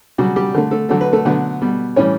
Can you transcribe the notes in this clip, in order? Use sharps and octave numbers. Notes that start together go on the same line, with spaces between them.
C#3 F#3 G3 F#4
G3 G4
D3 A3
A3 A4
D3 F#3 A3 A4
B4
A3 A4
D3 F#3 A3 B3 B4
B2 G3
A2 E3 G3 C#4 C#5